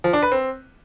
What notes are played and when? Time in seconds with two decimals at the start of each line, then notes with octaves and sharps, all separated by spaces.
0.04 F3
0.13 D4
0.23 B4
0.32 C4